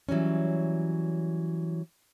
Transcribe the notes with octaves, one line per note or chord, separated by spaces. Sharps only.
E3 F#3 G3 C#4